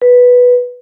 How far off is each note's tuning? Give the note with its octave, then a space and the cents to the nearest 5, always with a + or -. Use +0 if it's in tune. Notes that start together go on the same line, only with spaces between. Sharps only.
B4 -5